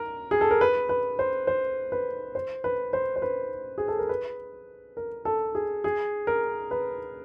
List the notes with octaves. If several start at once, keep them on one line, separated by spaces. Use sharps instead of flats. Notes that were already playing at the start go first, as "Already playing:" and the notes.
Already playing: A#4
G#4
A4
A#4
B4
B4
C5
C5
B4
C5
B4
C5
C5
B4
G#4
A4
A#4
B4
A#4
A4
G#4
G#4
A#4
B4